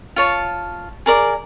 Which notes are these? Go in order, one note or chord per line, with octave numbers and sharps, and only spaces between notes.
F4 C#5 A5
G#4 A#4 D5